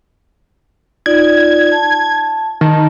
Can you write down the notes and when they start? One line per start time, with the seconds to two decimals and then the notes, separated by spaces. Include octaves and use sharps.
1.06 D#4 F4 D5 G#6
1.72 A5
2.61 D#3 A5